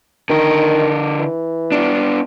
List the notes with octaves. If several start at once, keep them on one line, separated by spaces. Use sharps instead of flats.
D3 D#3 A#4
E3
B3 D4